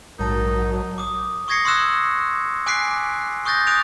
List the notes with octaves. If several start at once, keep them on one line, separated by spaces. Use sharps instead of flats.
A#1 G#2 F#3 D#4 A#4 A5
D6 D#6
C#6 D#6 G#6 A#6 C7 C#7
C6 C#6 D#6 E6 F#6 E7
G#5 D6 F#6 B6 C7 D7
C#6 D#6 F#6 G6 A6 A#6
D6 D#6 F#6 D7 F7